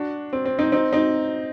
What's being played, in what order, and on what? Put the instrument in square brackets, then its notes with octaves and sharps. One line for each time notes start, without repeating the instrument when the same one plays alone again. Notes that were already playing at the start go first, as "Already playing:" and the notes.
Already playing: [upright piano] D4 F#4
C4
C4
C4 D#4
C4 D#4
C4 D#4